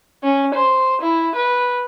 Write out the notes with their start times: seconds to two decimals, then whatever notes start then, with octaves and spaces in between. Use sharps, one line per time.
0.23 C#4
0.54 C5
1.02 E4
1.35 B4